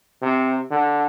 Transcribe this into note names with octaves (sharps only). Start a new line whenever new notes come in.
C3
D3